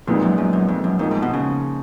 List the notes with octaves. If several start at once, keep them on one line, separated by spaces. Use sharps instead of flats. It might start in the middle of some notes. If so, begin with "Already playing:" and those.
F2 A#2 G#3 B3 D#4
F#2
F#2
F#2
F2
F#2
F2 F3 A#3 D#4
G#2
B2
C#3